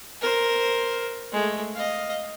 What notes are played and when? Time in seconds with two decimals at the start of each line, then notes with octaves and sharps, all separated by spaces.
0.21 A#4 C5
1.32 G#3 A3
1.74 D#5 F5